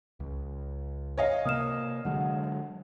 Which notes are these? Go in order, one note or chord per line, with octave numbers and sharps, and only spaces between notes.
C#2
C#5 D#5 F5
C3 A#3 D#6 F6 E7
D3 F#3 G#3 F#5